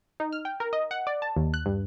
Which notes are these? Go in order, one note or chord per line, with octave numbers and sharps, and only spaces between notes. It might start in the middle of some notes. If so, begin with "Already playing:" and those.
D#4
F6
G5
A#4
D#5
F#5
D5
A5
D#2
F#6
G2